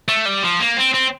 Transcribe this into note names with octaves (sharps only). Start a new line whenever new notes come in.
A3
G3
F3
A#3
C4
C4